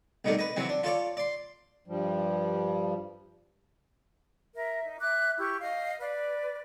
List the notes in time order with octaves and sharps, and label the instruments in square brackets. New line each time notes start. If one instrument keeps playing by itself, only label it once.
[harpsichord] C2 B2 D#3 A3 D4
B4 D#5
C3 E3 F#3 C4
D4
F4 A4 C#5 D5
D5 C6
[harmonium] G2 F3 G3
[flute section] A#4 E5
D#4
E5 D6 F#6
E4 G4 C#6
D#5 F5
B4 D5